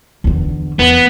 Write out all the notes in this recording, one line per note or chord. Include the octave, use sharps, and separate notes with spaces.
E2 D3
E2 B3